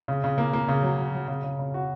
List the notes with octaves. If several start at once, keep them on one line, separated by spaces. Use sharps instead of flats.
C#3
C#3
A#3
A#3
C#3
F#3
F#3
F#3
C#3
C#3
C#3
F#4